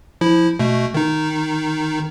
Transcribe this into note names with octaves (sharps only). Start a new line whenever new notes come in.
F3 E4
B2 A3
D#3 D#4